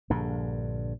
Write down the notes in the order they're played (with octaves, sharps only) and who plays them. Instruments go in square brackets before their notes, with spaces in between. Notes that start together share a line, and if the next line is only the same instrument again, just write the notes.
[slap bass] A#1 G2 D3